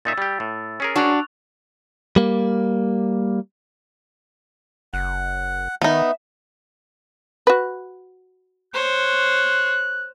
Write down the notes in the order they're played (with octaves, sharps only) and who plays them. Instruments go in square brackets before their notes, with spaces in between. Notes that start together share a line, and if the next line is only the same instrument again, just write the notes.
[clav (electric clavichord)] A#2 D#4 E5 [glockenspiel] E6 A6
[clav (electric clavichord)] G3 G4
A2
C#4 G#4 A#4
[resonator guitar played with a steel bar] D4 F#4 [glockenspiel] C#6 F#6 F7
[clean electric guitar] G3 A#3
[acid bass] F#1 [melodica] F#5
[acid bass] D#3 [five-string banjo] B3 D#4 [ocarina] E5
[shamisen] F#4 B4
[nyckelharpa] C5 C#5 [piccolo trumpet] F#6